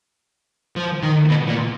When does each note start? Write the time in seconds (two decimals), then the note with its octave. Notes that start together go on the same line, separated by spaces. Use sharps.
0.76 F3
1.03 D#3
1.29 B2
1.48 A#2